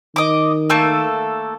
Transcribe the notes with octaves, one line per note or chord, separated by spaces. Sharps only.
D#3 D#5 D6
A3 A#3 A4